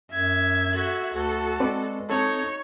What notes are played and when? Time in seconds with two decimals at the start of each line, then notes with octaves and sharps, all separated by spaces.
0.11 F#2 E5 G#6
0.71 F#4 A4
1.14 D2 F#4 A4
1.60 G#3 C4 B4 D5
2.10 C4 D#4 A4 C#5